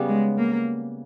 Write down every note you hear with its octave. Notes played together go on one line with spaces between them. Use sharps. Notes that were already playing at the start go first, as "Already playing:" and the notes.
Already playing: C#3 G3 B3
G#3
A#3